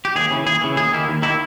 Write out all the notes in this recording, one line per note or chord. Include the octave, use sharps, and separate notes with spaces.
G4
D#2 G#4
C#3 E3
D#2 G#4
C#3 E3
D#2 G#4
D#3 A#3 E4
D#2
D#3 A#3 E4